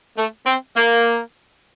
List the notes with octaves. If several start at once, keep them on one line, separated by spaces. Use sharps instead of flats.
A3
C4
A#3